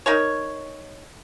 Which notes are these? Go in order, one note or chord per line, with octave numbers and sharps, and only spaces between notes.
D#4 A#4 C#5